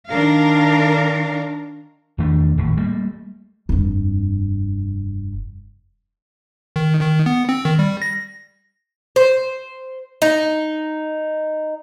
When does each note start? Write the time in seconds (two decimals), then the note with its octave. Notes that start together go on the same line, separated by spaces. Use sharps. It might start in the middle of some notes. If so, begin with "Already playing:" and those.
0.10 D#3 D4 A#4 F5
2.18 E2 D#3 A3 D4
2.58 D#1 G#1 D#2 A2
2.77 G3 A3 A#3
3.69 F1 G2
6.76 D#3
7.01 D#3
7.26 B3
7.49 C4
7.65 D#3
7.79 G3
8.02 A#6
9.16 C5
10.22 D#4